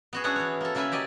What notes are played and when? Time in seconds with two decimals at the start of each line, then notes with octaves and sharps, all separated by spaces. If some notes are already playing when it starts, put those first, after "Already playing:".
0.13 B3 F#4 G#4
0.24 C#4 D4 E4 F#4 G#4 F#5
0.36 E3 C#5
0.61 A#3 A4
0.75 C#3 A#3 E4 B4 E5 G#5
0.91 F#3 G4 D5 D#5 G#5